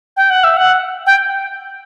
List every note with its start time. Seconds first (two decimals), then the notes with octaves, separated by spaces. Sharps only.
0.17 G5
0.30 F#5
0.44 E5
0.57 F#5
1.07 G5